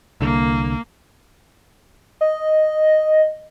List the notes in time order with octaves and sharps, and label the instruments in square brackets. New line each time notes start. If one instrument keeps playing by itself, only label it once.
[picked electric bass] C2 D3 [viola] A#3
[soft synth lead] D#5